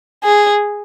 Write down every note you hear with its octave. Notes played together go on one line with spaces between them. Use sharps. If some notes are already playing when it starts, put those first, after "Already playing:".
G#4